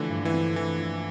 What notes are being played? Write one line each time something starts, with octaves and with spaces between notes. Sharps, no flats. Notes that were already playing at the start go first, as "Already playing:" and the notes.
Already playing: D3 E3 F3 A3
G2
E3
C4
E3 A3
F3